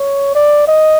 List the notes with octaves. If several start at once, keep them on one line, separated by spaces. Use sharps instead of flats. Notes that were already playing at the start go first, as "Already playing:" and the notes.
Already playing: C#5
D5
D#5